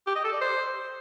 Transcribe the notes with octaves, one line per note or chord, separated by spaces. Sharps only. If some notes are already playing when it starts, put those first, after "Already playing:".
G4
D#5
A4
D5
C5